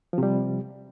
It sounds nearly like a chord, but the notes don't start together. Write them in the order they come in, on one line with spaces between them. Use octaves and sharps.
F3 C3 G3